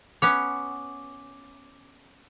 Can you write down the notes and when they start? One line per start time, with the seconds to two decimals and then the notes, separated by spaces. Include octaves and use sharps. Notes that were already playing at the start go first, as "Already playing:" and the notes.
0.22 B3 C#4 C#5 D6